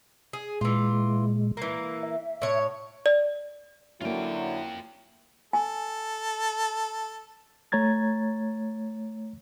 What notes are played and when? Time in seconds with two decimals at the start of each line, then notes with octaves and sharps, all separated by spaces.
0.33 G#4
0.61 A#2 E3 G#3 F4
1.57 E3 A#3
2.03 E5
2.42 A2 C#5
3.06 D5
4.01 D3 F#3 A#3 C#4 E4 F4 G5
5.53 A4 G#5
7.72 A3 C#5 A#5 G#6 A6